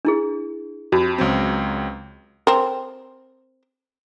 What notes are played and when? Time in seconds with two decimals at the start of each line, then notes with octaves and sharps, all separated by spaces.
0.05 D4 E4 G#4
0.92 F2 F#4
1.18 C#2 F#3 C4
2.47 C4 A#4